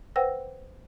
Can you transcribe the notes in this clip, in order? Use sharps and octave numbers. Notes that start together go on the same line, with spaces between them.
B4 C5 F#5 G5 E6 A#6